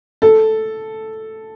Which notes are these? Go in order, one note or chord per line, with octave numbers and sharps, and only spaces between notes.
A4